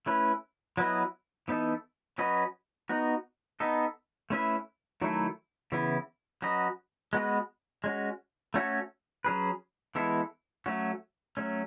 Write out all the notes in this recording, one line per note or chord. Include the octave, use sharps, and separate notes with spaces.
A3 C#4 E4 B4
F#3 B3 E4 B4 D#5
E3 B3 D#4 A4
F#3 C#4 F#4 B4 D#5
B3 D#4 F#4
B3 D#4 A4 D#5
A3 C#4 E4 B4 E5
D#3 F#3 A3 E4 A4
C#3 E3 B3 E4
F#3 C#4 F#4 B4 D#5
G#3 B3 F#4 B4 D#5
G#3 C#4 F#4
A3 C#4 F#4 A4 C#5
F#3 C#4 G#4 B4
E3 G#3 B3 E4 A4
F#3 A3 C#4 F#4
F#3 A3 C#4